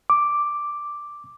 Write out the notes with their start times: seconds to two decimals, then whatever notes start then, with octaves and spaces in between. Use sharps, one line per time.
0.10 D6